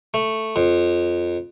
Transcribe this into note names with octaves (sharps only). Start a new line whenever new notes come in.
A3
F2